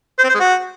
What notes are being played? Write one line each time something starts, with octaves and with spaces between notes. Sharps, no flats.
C5
C4
C5
G#3
F#4